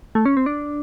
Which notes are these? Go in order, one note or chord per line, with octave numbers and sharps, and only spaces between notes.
A3
C#4
C4
D4